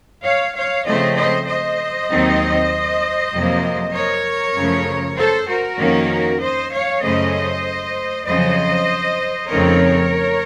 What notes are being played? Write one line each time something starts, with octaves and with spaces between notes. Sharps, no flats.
C#5 F5
C#5 F5
C#3 F3 A3 C4 C5 D#5
C5 D#5
C5 D#5
D#2 D#3 F#3 C4 D#4
F2 C3 F#3 A#3
A#4 C#5
F#2 C#3 F3 A3
A4 C5
F#4 A#4
F2 D#3 A#3 C#4
C5 D#5
C#5 F5
F#2 C#3 A3 C#4 C5 D#5
F2 C#3 F#3 C5 D#5
F2 C#3 A3 C4 D#4 A#4 C#5